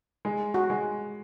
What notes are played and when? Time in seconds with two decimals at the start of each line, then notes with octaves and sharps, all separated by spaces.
0.25 G#3
0.54 F#4
0.70 G#3